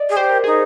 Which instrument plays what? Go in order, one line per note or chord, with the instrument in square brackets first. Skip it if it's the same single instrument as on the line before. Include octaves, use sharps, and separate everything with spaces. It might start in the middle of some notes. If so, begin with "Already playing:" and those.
Already playing: [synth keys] D5 D#5
[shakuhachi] G#4
[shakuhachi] G4 [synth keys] C5
[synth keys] A#4
[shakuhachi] D#4 [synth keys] G#4